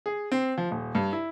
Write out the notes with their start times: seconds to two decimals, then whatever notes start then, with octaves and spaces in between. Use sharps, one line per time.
0.06 G#4
0.32 C4
0.58 F3
0.71 D#1
0.95 G2
1.13 E4